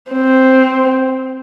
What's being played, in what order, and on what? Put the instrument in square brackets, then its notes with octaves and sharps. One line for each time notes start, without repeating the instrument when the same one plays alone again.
[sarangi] C4